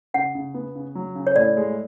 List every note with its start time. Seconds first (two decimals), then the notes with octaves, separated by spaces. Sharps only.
0.14 C#3 F#5
0.35 C#3
0.54 B3
0.75 C#3
0.95 F#3
1.15 C#3
1.27 C#5
1.36 A2 D5
1.57 G#3